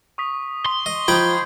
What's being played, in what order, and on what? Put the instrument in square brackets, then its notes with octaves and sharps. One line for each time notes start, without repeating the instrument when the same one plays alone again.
[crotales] C#6 D#6 B6
[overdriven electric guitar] C6
[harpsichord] D#5
[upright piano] F3 [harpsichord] D#4 G5 B5 [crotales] G6 G#6